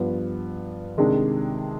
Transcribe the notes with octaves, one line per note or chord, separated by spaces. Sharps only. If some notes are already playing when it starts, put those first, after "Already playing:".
Already playing: G2 F3 B3
C3 D#3 G#3 D4 G#4